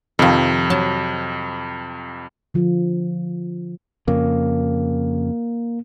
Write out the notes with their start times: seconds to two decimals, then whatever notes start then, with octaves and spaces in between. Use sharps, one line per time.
0.19 F2 C3 D#3 F3
0.70 F#3 A5
2.54 D3 F3 F4
4.08 F2 C#3 A#3